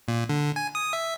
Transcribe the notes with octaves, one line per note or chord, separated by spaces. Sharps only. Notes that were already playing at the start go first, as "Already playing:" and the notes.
A#2
D3
G#5
D#6
E5